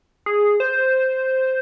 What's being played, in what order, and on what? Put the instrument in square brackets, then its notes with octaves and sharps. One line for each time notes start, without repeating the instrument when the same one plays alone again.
[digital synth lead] G#4
C5